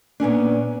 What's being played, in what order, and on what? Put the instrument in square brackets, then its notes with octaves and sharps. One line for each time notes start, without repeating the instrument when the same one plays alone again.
[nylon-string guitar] A#2 B3 C#4 D4